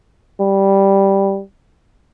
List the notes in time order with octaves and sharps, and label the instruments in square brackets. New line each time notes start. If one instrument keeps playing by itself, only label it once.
[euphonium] G3